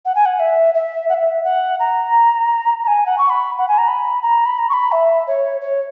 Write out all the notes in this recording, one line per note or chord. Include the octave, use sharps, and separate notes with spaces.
F#5
G#5
F#5
E5
E5
F#5
E5
F#5
A#5
A#5
G#5
F#5
C#6
B5
F#5
G#5
A#5
B5
A#5
B5
A#5
C#6
B5
E5
C#5
C#5